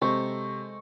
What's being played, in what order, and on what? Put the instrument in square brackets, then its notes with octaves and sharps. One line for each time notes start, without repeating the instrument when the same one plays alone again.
[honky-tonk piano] C3 [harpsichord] G#3 A4 C5 [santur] C#6